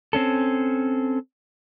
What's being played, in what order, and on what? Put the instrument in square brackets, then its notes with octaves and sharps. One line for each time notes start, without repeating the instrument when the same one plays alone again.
[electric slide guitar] C4 C#4 A4